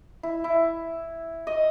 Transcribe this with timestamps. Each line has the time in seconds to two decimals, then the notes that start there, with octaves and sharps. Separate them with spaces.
0.23 E4
0.44 E4
1.47 D#5